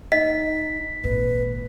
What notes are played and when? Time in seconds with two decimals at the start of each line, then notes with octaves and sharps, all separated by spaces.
0.12 D#4 D#5 B6
1.04 G#1 A#2 B4